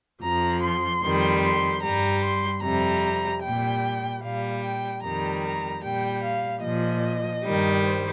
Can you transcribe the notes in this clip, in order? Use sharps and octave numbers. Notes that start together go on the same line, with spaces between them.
F2 F3 A#5
C6
F2 D#3 G3
C6
G2 G3 A#5
C6
F2 C3 G3 A#5
A#2 G3 G5
A#2 G3 F5
G5
F2 D#3 G3 A#5
A#5
A#2 G3 G5
F5
A#2 F3 D#5
G2 D#3 G3
C5